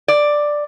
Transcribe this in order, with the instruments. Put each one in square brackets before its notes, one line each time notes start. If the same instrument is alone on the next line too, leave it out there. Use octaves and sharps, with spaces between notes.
[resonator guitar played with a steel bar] D5